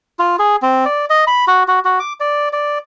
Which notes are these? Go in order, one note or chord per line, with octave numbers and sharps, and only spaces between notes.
F4
G#4
C4
D5
D#5
B5
F#4
F#4
F#4
D6
D5
D5